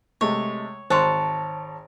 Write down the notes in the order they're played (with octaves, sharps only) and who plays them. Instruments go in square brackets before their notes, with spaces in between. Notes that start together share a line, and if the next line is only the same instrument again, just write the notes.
[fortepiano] C3 G#3 A3 [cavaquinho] C#5
[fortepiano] G#1 [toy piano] C5 C6 [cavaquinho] C#5 A5